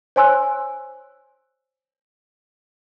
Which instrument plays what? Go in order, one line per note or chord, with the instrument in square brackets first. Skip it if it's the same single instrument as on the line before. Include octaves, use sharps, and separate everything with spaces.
[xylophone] C5 C#5 G#5 C6 E6 F#6